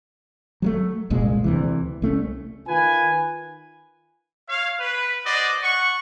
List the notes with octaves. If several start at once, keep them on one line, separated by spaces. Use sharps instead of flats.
F#3 G3 A3
F#1 C2 A#2 G#3
D2 C3 E3
C2 A3 C4 C#4
D#3 F4 B4 G#5
C#5 F5
B4
F#4 C5 D5 D#5
F#5 C#6